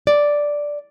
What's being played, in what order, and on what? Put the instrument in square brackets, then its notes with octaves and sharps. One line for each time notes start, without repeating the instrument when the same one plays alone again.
[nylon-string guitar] D5